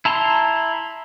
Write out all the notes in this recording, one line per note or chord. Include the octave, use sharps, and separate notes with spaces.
E4 A5 A#5 C6